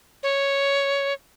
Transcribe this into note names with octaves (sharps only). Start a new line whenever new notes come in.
C#5